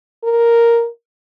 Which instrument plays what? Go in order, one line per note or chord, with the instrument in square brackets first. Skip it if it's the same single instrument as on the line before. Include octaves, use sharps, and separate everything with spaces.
[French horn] A#4